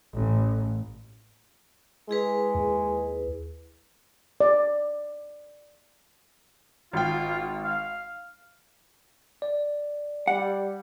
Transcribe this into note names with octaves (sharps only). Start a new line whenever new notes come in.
A1
G#3 E4 G#4 B4
D#2
D5
G#1 F4 G5
F5
D5
G3 F#5